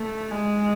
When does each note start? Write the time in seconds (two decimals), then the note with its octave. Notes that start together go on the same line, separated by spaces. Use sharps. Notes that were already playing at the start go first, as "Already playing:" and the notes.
Already playing: A3
0.32 G#3